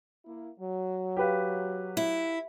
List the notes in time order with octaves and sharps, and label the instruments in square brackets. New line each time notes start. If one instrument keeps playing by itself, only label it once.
[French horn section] A#3 E4
F#3
[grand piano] G4 B4 F5
[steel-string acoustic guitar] E4